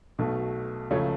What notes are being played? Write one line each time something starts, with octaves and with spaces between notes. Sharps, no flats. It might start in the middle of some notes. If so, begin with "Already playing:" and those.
B1 B2 A3
C#2 C#3 F3 A3 C#5